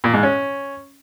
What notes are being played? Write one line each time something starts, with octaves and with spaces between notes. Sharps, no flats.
A#2
G#2
C#4